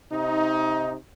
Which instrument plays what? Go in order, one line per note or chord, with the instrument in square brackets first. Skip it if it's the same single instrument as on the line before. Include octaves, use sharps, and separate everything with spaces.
[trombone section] C3 D#4